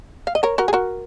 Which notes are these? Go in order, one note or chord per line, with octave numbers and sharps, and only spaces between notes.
F5
D#5
A#4 C#5
F#4 A#4
G#4
F#4 A#4